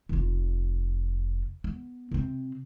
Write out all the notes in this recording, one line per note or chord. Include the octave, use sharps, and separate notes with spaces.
F1 F4
B3
C3 C4